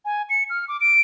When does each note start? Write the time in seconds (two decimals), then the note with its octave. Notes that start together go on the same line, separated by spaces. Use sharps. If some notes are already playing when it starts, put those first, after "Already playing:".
0.05 G#5
0.30 C#7
0.50 F6
0.68 D6
0.81 D7